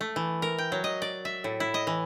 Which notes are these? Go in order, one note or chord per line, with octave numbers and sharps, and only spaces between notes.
A3
E3
A#4
G5
F#3
D#5
D5
E5
A2
E4
D#5
E3